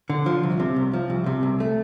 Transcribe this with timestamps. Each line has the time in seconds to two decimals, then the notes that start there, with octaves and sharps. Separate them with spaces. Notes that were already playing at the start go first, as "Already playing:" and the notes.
0.10 D3
0.26 F3
0.43 C2
0.60 C3
0.76 C2
0.93 F3
1.10 C2
1.26 C3
1.43 C2
1.60 A3